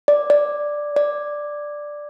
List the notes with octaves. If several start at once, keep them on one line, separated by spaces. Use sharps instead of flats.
D5
D5
D5